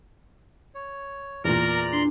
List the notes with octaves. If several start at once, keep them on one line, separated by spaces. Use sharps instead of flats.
C#5
E2 A#2 A#4 D5 A#5
D4 C6